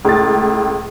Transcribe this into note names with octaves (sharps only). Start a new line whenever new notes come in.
C#2 A2 A6